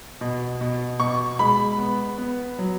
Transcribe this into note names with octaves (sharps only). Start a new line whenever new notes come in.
B2
B2
B2 C#6
G#3 B5
B3
B3
F#3